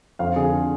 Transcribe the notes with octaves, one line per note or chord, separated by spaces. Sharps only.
F2 F5
D3 G#4